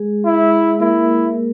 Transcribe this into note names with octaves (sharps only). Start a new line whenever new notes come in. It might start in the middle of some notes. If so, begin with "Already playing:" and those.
Already playing: G#3 G#4
E4
A#3 E4 A#4